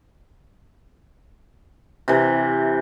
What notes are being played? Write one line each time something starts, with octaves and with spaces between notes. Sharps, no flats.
C3 E3